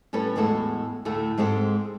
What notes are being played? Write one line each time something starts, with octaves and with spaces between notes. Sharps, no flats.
A2 G3 C#4 A4 B4
E2 A2 G#3 F#4 A4
D2 A2 A3 A4
G#2 G#3 C4 G4 A4 G5